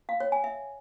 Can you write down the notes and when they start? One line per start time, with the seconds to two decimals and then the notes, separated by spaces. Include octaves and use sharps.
0.09 F5
0.20 C#5
0.32 G#5
0.44 E5